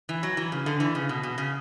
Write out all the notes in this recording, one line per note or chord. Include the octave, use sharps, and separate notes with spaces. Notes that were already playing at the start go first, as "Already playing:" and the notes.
E3
F#3
E3
C#3
D3
E3
C#3
B2
B2
C#3